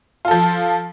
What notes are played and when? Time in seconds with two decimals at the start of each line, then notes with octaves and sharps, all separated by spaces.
0.25 F4
0.28 A4
0.31 F3